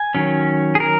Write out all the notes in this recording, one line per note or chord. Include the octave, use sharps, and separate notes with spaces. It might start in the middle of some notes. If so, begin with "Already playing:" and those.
Already playing: G#5
D#3 F#3 C#4
G#4
A#4